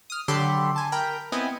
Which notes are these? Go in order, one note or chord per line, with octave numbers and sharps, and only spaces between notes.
D#6 F6
D3 F#3 G4 A4 B5 C6
G#5 A5
A#4 G5 A#5 B5
B3 C4 E4 D#5 G#5